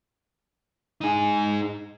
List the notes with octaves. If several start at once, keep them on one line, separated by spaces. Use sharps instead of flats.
D#4 G#4